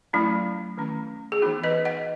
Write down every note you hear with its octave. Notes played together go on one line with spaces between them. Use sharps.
F#3 A3 C#4 E4
D#3 A3 C#4
G#4
E3 B3 D#4 F#4
B4 D#5
D#5 F#5